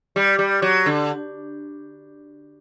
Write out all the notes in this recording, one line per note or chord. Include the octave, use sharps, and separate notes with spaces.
G3
G3
F#3
D3